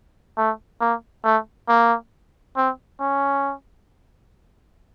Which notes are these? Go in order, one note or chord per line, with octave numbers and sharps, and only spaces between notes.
A3
A#3
A3
A#3
C4
C#4